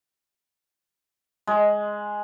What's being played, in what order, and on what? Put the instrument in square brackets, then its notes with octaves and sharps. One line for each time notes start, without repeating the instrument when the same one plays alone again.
[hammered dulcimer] G#3